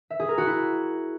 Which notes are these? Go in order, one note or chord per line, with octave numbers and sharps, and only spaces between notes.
E5
G#4
A#4
F#4
E4